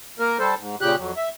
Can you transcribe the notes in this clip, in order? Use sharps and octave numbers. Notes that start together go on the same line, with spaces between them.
A#3 A#4
G3 A4 C5
G#2
A#2 C#3 G4 F#6
F2 F#3
E5